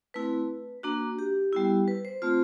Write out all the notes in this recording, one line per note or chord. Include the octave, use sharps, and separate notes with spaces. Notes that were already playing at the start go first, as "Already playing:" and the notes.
A3 C4 E4 B4
A#3 D4 F#4
G4
G3 B3 E4
B4
C5
A3 C4 F4 C5